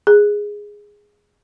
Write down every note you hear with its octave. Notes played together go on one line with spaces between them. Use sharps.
G#4